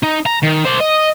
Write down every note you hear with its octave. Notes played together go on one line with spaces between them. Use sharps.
D#4
A#5
D#3
C5 D5
D#5